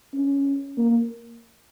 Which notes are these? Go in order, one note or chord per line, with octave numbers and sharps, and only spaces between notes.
C#4
A#3